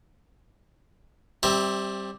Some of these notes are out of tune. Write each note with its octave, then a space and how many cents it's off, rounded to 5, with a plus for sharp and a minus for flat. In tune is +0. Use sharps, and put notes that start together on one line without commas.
G3 +0 C4 +20 E5 -25